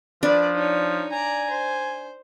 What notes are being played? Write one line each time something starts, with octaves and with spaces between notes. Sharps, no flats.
F3 D4 B4 D5
D#4 C#5
D5 G#5 A#5
C5